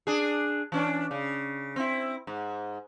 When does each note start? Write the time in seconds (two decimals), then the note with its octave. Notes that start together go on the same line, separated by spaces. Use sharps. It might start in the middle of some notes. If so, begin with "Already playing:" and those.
0.07 D4 G#4
0.72 E3 C#4 D4
1.11 C#3
1.76 C4 E4
2.27 G#2